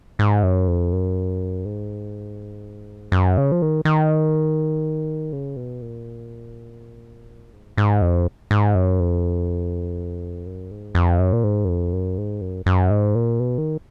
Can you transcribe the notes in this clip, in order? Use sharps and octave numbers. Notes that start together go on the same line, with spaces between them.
G#2
F#2
F2
F#2
G#2
F#2
C#3
F3
D#3
D#3
C#3
B2
A#2
G#2
G#2
F2
G#2
F#2
F2
F#2
G#2
F2
F#2
A#2
G#2
F#2
F2
F#2
G#2
F#2
F#2
G#2
A#2
B2
D#3